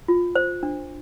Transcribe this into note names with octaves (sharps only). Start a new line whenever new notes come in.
F4
C5
D4